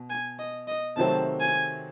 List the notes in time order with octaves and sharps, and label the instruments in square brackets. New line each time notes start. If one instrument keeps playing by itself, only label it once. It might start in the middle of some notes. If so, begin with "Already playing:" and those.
Already playing: [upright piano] B2
[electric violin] G#5
D#5
D#5
[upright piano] C3 D#3 F#3 A3 C4 [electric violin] A5
[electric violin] G#5